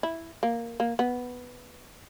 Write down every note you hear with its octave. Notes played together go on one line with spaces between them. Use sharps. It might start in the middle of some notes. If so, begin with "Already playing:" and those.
E4
A#3
A#3
B3